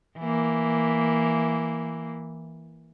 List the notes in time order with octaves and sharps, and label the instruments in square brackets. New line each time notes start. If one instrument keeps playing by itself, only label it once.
[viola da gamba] E3 A#3